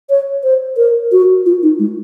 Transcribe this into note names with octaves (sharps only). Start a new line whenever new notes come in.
C#5
C5
A#4
F#4
F4
D#4
G#3